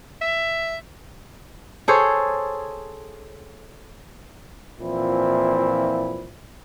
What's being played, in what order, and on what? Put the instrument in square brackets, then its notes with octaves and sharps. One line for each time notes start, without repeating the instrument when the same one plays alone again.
[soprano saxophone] E5
[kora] G#4 A4 C5 C#5
[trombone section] A#2 E3 F3 C4 E4